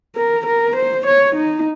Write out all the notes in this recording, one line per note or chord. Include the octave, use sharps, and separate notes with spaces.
A#4
A#4
C5
C#5
D#4